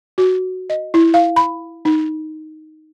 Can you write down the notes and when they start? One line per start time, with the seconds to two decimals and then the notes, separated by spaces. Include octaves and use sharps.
0.18 F#4
0.70 D#5
0.94 E4
1.14 F5
1.36 B5
1.85 D#4